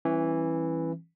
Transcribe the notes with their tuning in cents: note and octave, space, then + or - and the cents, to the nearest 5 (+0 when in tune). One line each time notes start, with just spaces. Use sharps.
E3 +0 G3 -5 C#4 -40